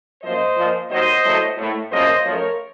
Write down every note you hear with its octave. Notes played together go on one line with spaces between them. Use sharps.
F#2 F3 A#3 C5 D#5
A#2 F3 A#3
D#2 D#3 F#3 C5 D#5
A2 F#3 A3
A2 A3
F#2 C#3 F3 A#3 C5 D#5
F#2 F3 A3 A#4 C#5